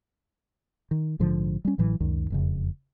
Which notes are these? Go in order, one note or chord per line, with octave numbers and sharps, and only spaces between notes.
D#3
A#1 G#2 D3 F3
G3 C#4
A1 A2 E3 F#3
C#2 F#2 D#3
E1 F2 C#3